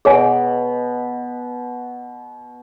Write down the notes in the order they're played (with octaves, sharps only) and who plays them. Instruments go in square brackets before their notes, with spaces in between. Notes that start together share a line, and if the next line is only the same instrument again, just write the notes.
[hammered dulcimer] B2 [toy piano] G#4 C#5 G#5